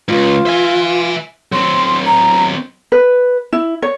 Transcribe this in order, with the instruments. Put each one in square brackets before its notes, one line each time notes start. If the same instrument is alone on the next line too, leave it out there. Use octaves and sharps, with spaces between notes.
[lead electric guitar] C#2 G#2 [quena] F4
[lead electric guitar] E5 G#5
[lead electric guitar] F#3 C4 [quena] C6
[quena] A#5
[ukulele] B4
E4
C#5